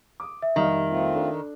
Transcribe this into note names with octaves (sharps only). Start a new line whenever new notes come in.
D6 D#6
E5
F1 D#3 G3 F5
A3 C4 F4
D4 A4